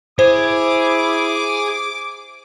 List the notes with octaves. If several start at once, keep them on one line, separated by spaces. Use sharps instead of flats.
E4 G#4 C5 D6